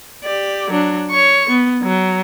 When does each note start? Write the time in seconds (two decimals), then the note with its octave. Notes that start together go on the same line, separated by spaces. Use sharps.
0.24 G4 D5
0.70 F#3 D4
1.11 C#5 C#6
1.50 B3
1.83 F#3